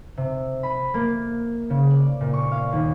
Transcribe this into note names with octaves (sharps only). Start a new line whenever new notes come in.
C3
B5
A#3
C#3
D5
A#2
C#6
F5
D#2